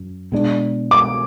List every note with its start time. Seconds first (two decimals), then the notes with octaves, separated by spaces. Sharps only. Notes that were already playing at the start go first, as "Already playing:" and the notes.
Already playing: F#2
0.32 B2 G#3 D4
0.91 D6